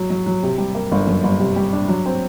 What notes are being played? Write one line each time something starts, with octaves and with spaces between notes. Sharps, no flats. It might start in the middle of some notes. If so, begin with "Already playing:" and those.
Already playing: F#3
F#3
F#3
C3
G3
A#3
G1
F#2
G1
C3
G3
D4
F#3
C4